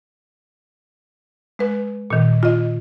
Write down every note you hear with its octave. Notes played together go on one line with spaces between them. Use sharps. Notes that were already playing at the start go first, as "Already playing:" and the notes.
G#3 B4
A#2 D#3
F4 D#5